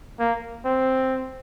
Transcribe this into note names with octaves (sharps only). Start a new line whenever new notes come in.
A#3
C4